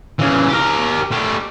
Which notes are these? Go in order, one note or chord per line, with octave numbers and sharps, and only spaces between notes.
C#3 E3
G4 A#4
A3 G4